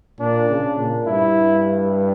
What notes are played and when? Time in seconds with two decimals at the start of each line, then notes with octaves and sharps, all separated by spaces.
0.20 A#2 D4
0.49 C#3
0.79 A#2
1.07 G2 E4